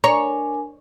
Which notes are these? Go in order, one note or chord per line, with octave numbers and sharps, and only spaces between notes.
D4 A#4 C#5 G#5 A#5